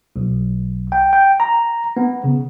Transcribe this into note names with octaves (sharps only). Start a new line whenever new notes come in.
B1
G5
G5
A#5
B3
C#3